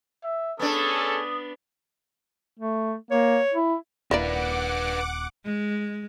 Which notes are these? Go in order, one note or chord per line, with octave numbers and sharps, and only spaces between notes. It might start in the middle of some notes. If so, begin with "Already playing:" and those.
E5
B3 C#4 D4 G#4 A4 D#6
A3
A#3 C#5
E4
D#1 A#3 D4 E4 B4 D5 F#5 D6
G#3